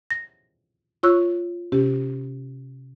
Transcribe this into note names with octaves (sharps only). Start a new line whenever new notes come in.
A#6
F4 C#5 C#6 E6 F#6
C3 C#4 G4